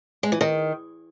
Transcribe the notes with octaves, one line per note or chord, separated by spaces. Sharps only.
G#3
E3
D#3